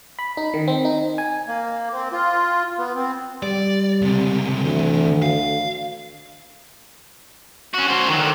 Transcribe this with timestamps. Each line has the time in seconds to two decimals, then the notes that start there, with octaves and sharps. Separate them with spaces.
0.19 B5
0.37 D#4
0.54 D#3
0.68 C4
0.85 D#4
1.18 G#5
1.48 A#3
1.93 C4
2.12 F4
2.78 B3
2.95 C4
3.43 G3 D5
4.02 C#2 C3
4.64 D2 E3 C4
5.22 F5
7.74 C#4 F#4
7.88 F#4 C5
8.08 D#3 F#3
8.20 D3 D#3